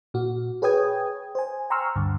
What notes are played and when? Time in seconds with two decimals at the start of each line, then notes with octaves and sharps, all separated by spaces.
0.14 A#2 F#4
0.62 G#4 B4 C#5 G5 D#6 G#6
1.35 C5 G#5
1.70 G5 A#5 C6 C#6 E6 F6
1.96 D2 G2 D3